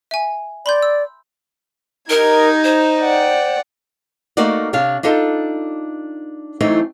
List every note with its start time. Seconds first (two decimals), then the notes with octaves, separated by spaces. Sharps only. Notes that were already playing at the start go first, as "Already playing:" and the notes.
0.11 E5 G#5
0.66 D5 B5 C6 G6
0.82 E6
2.10 D#4 G4 A#4 A#5 G#6
2.64 C5
3.00 D5 F#5 G5
4.37 A3 A#3 D#4 F#4 A#4 D5
4.73 C3 D4 C#5 F5
5.03 D4 D#4 F4 A4
6.61 E3 F#3 A3 C4 D#4